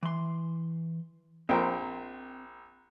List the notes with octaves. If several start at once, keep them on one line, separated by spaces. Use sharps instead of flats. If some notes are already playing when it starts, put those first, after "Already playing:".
E3 C6
A#1 C4 C5 G5 A#5